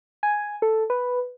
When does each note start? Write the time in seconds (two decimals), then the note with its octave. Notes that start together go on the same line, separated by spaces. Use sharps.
0.23 G#5
0.62 A4
0.90 B4